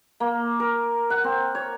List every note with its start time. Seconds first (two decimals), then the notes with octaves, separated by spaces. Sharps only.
0.20 A#3
0.60 A#4
1.10 F#5
1.24 C4
1.55 C#5